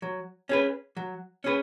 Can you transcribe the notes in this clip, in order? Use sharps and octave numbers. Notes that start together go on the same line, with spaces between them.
F#3
C#4 G#4 B4
F#3
C#4 G#4 B4